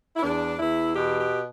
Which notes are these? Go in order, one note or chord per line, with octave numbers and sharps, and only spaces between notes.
E4
E2 D4
E2 E4
B2 G4
G4